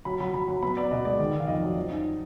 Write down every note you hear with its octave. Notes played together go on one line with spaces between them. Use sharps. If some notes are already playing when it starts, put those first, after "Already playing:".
F#3 B5
F#3 B5
F#3 B5
F#3 B5
B3 B5
B3 D5
B2 D#5
G#3 D5
D#3
D#3
F5
F2 D#5
F#3
F3
D#4